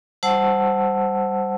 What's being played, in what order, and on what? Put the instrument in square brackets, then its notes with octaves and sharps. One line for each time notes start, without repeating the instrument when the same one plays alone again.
[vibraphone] G3 C5 F#5 A5 E6